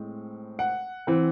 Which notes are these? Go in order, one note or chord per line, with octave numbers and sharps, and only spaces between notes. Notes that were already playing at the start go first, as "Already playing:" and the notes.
Already playing: A2 G#3 C4
F#5
E3 C4